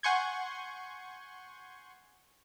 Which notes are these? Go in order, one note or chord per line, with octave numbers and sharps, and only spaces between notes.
F#5 G#5 C6 C#6 G6 G#6